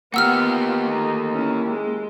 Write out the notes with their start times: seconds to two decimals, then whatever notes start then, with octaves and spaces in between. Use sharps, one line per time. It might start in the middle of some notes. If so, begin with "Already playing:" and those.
0.14 A#3 B3 F4 G4 F#5 E6 F6
0.88 A3 D#4
1.32 C#4 E4
1.70 G#3